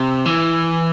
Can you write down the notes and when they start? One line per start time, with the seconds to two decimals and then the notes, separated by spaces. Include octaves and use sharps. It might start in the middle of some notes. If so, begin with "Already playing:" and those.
Already playing: C3
0.25 E3